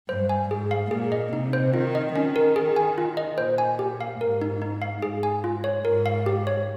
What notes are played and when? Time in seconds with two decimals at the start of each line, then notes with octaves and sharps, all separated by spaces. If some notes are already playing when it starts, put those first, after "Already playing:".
0.09 G2 C5
0.29 G#5
0.50 G#2 G#4
0.71 F5
0.91 A#2 G#4
1.12 D#5
1.33 C3 D#4
1.53 C5
1.74 D#3 F4
1.95 D#5
2.15 D#3 C#4
2.36 A#4
2.56 G#4
2.76 G#5
2.98 F4
3.17 D#5
3.38 A#2 C5
3.58 G#5
3.79 G4
4.01 F5
4.20 G#2 A#4
4.41 D#4
4.62 D#4
4.82 F5
5.02 G#2 G#4
5.23 G#5
5.44 F4
5.64 C#5
5.85 G#2 A#4
6.06 F5
6.26 G4
6.47 C#5